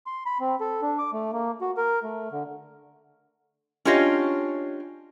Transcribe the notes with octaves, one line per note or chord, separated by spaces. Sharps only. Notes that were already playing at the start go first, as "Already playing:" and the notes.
C6
B5
C4
A4
D4
D6
A3
A#3
F#4
A#4
A3
D3
C#4 D4 F4 G4 C#5 D#5